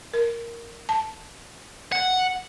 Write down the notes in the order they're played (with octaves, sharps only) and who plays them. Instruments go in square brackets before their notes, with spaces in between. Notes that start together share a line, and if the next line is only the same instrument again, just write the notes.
[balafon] A#4
A5
[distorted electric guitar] F#5